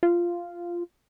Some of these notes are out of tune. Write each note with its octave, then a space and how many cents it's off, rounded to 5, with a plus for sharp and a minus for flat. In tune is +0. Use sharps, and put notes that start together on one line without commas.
F4 -10